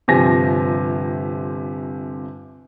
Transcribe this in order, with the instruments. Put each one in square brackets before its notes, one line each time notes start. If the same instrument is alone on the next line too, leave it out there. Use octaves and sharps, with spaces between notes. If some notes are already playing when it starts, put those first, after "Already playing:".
[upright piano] G1 C3 F3 G4 G#5 A#6